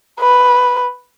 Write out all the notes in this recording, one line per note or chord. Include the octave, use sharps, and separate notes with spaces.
B4